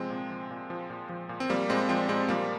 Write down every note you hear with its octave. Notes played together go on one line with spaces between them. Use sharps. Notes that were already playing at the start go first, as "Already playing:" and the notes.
Already playing: C3 F3 G#3 C4
A#2
F3
A#2
F3
A#2
F3
A#2
C4
F3 G3 A#3
A#2 G#3 C4
F3 G#3 C4
A#2 G#3 C4
F3 G3 A#3